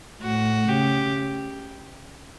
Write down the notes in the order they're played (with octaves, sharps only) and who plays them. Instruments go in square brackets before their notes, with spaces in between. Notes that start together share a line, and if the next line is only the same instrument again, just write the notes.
[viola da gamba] A2 [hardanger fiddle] F#4
[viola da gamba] C#3 [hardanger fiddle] G4